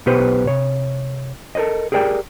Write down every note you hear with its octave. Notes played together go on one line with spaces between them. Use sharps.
B1 B2 B3 G4 B4 C5
C3 C#5
A4 A#4 C5 D5 D#5
G4 G#4 A#4 D5 G5